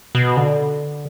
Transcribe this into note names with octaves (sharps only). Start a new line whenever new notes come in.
B2
D3